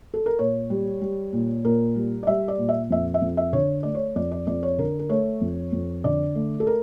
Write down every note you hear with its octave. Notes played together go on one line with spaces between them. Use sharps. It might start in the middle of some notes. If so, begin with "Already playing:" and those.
A4
A#4
A#2 C#5
G3
G3
A#2
A#2 A#4
G3
D5
G3 E5
D5
A#2
E5
F2 E5
E5
F2
E5
D3 C#5
A3 D5
C#5
F2 D5
D5
F2 D5
C#5
D3 A#4
A#4
A3 C#5
F2
F2
D3 D5
A3
A4
A#4